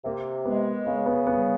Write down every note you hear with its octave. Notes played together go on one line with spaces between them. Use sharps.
C3 A#3
G#3 B3
C#3 B3
B3
G3 B3